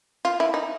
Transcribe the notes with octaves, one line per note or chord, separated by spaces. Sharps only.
F4
E4
D#4